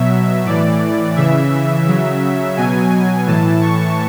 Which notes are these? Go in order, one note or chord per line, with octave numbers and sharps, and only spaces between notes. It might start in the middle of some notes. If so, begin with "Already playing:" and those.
Already playing: B2 F#3 E5
A2 E3 D5
C#3 E3 E5
C#3 F#3
B2 F#3 G#5
A2 E3 A5
C#6